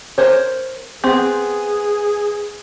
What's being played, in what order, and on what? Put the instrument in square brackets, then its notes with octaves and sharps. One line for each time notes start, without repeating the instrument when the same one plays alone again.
[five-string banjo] A#4 C5 C#5
[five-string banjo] B3 C4 [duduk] G#4